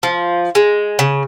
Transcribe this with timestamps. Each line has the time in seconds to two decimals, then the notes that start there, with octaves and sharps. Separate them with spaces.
0.03 F3
0.55 G#3
0.99 C#3